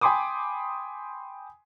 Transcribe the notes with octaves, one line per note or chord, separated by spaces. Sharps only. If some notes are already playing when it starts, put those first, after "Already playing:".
G5 G#5 B5 C6 D6 D#6